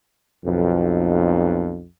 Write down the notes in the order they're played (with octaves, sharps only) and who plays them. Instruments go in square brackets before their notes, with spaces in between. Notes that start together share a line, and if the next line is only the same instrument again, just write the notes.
[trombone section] B1 F2